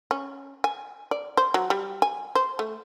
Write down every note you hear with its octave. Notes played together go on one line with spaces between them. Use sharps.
C#4
G#5
D5
C5
F#3
G3
G#5
C5
A3